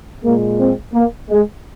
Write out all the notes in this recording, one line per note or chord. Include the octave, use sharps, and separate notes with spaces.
A#2 G#3 A#3
C4
A#3
G#3